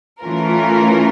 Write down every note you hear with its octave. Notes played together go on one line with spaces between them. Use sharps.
E3 A3 C#4 F4 A#4